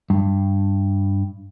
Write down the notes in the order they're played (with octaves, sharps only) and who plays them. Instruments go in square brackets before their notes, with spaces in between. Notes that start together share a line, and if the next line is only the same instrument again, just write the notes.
[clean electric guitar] G2